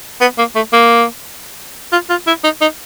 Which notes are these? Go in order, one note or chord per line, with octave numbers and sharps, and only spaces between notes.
B3
A#3
A3
A#3
F4
F4
E4
D#4
D#4